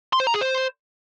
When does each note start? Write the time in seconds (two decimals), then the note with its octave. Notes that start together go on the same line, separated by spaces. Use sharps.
0.13 C6
0.20 C5
0.27 A#5
0.34 G#4
0.41 C5